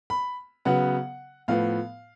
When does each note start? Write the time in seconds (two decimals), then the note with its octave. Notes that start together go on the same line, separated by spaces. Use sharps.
0.10 B5
0.65 C#3 F#3 B3 F#5
1.48 A2 F3 B3 F5